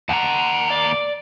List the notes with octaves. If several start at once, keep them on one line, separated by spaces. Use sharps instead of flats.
D#2 A#4 F#5 A5
D5